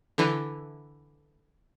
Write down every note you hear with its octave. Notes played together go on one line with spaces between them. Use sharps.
D3 E3